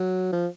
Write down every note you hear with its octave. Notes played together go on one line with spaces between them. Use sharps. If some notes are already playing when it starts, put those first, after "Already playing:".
Already playing: F#3
F3